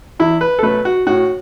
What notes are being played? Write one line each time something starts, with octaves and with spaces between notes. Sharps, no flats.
E2 E4
B4
A4
B2 F#3 A3 B4
F#4
A2 F#4